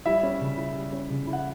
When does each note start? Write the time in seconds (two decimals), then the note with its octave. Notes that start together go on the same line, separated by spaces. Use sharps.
0.05 G3 E4 E5
0.23 C#4
0.41 C#3
0.57 E4
0.75 G3
0.93 C#4
1.10 C#3
1.27 E4
1.33 F#5